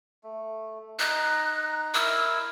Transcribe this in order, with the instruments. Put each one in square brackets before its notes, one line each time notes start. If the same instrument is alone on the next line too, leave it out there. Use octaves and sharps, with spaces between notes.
[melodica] A3
[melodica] D#4 A#5 [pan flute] F#6
[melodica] E4 A#4 [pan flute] E6